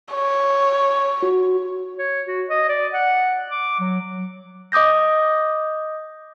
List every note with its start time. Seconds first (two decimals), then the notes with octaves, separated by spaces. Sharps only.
0.13 C#5
1.22 F#4
1.98 C#5
2.27 F#4
2.50 D#5
2.69 D5
2.94 F#5
3.51 D6
3.80 F#3
4.72 D#5 D6 D#6 G6 A#6